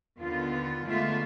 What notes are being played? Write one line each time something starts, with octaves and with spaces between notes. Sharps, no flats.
D#2 D3 B3 F4
D3 G#3 A3 B3 F4 E5